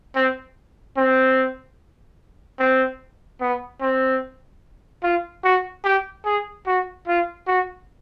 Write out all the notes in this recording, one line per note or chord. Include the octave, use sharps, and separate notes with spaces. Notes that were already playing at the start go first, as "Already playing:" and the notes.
C4
C4
C4
B3
C4
F4
F#4
G4
G#4
F#4
F4
F#4